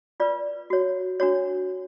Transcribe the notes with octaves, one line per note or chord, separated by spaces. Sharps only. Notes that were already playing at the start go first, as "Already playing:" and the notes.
F4 B4 D5
F#4 C#5
D4 F#4 C#5